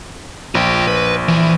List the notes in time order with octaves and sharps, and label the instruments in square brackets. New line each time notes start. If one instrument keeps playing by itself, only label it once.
[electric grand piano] A#1 [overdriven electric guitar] F4 G5
[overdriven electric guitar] B4
E3